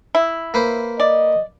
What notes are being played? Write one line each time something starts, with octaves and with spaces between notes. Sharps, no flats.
E4
A#3 B4 C5
D5 D#5